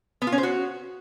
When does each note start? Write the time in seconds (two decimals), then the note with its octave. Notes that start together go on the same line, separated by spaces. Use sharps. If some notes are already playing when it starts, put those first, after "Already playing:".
0.22 B3
0.27 F4
0.32 C#4
0.38 C5
0.43 F#4